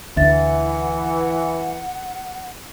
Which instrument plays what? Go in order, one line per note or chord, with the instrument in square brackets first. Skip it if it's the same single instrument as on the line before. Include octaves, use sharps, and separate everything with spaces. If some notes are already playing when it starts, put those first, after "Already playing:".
[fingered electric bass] D2 [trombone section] E3 [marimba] E5 A6 [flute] F#5